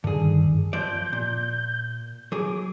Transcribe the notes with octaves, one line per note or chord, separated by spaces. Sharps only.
G2 D3 D#3 G#4
F3 D5 G6
A#2
F#3 G#4 D6